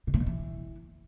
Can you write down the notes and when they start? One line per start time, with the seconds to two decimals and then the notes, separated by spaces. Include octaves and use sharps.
0.07 B2
0.14 A2
0.20 B2
0.27 E3